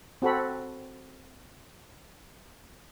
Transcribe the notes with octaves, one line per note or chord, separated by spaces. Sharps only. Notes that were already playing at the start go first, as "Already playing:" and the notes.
C4 F#4 A4 B5